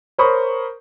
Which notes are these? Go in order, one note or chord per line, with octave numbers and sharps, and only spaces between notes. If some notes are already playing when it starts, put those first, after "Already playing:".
A#4 C5 C#5 B5 C#6 D#6